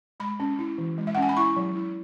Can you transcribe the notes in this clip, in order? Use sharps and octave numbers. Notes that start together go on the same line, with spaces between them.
G#3 B5
C#4
E4
E3
G#3
E5
F#5
C#4
G#5
B5
E4 C#6
F#3
E4